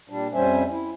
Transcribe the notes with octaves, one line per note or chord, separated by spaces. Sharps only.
A#2 G3 D4
F2 G3 C#4 C5 E5 G#5
E4